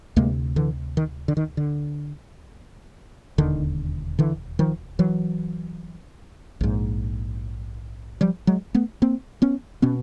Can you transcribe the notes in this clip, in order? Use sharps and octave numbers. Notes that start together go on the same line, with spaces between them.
D2 C3 G#3 A#3
D3 E3
D#3
D3
D#3
D3
E1 D#2 D3 D#3
D3 E3
D#3 F3
E3 F#3
A#1 G#2
F3 G3
F#3 G#3
A3 B3
A#3 C4
B3 C#4
B2 B3 C#4